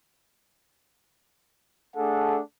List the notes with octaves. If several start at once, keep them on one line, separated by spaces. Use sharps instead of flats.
A3 D4 G#4 A4 F#5